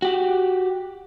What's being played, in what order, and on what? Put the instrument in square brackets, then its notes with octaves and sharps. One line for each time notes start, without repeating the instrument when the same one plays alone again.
[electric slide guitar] F#4 G4